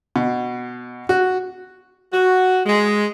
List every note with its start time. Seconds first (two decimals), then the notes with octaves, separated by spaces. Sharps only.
0.16 B2
1.09 F#4
2.12 F#4
2.66 G#3